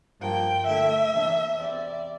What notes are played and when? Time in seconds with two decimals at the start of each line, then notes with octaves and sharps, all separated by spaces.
0.20 G2 F3 A#3 G5
0.66 D3 A3 E4 E5
1.11 C3 E3 A#3 D4
1.57 E2 C3 G3 D5